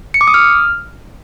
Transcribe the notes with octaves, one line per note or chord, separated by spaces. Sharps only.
C#7
D6
D#6
F6